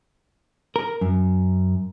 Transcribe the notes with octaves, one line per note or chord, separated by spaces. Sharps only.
A#4
F#2